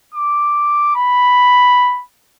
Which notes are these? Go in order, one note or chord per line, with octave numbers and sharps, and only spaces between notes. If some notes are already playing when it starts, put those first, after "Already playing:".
D6
B5